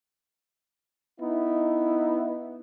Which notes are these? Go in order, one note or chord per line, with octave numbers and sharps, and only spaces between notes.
B3 D#4 E4